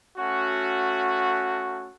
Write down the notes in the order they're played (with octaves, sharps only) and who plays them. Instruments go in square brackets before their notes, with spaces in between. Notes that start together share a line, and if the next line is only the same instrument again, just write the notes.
[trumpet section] A3 C#4 F#4